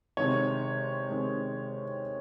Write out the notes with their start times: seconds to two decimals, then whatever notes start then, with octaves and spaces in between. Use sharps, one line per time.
0.17 C3 D#3 G#3 C#5
1.09 C3 D#3 G#3